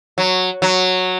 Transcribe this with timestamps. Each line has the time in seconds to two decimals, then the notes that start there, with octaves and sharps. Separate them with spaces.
0.18 F#3
0.62 F#3